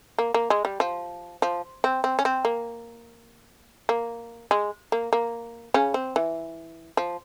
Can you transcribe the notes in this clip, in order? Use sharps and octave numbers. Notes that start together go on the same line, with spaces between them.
A#3
A#3
G#3
G3
F3
F3
C4
C4
C#4
C4
A#3
A#3
G#3
A#3
A#3
C#3 C#4
C4
E3
F3